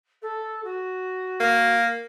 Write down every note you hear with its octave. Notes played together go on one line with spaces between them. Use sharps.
A4
F#4
A#3